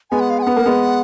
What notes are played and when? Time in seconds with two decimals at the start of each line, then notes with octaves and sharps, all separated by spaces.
0.11 G#3 B3 G#5
0.20 F#5
0.30 F5
0.39 G#5
0.42 B3 F#5
0.56 A#3
0.66 G#3 B3